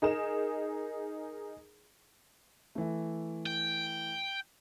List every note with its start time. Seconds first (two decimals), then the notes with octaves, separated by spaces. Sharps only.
0.02 D#4 G#4 A#4 E7
2.75 E3 A3
3.46 G5